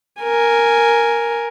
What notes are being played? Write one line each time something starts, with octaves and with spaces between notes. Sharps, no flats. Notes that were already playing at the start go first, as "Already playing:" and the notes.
A#4 G#5